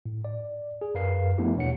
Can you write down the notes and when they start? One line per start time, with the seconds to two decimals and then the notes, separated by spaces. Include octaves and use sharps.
0.06 A2
0.25 D5
0.81 G#4
0.95 F#2 A#4 B4 F5 C7
1.38 F3 A3 B3 D4 E4 G4
1.56 E2 B2 C#5 F#5 C#7